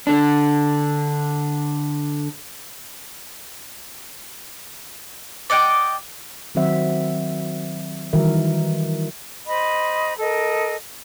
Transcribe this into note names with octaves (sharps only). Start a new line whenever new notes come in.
D3 D4
D5 D#5 F#5 G5
D#3 F#3 C4 C5 E5 F#5
D#3 E3 G3 F#4 A#4 E5
C5 D#5 B5
A4 A#4 D#5